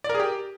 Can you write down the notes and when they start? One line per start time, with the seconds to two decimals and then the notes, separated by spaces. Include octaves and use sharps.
0.04 D5
0.09 A#4
0.15 G#4
0.20 G4